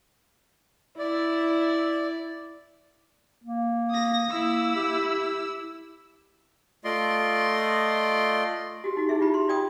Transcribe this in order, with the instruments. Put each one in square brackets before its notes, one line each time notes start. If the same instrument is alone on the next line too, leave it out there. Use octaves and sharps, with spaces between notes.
[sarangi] E4 [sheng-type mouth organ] D5
[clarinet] A#3
[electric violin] D#6 A#6
[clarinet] A#3 [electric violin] E4 E6
[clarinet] G4
[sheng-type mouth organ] A3 F4 D5 D#5 C6
[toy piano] F#4 G4
D#4 F#4
D#4 E4 G#4 E5
F4 G4 B5
C6
F4 D5 G5 D#6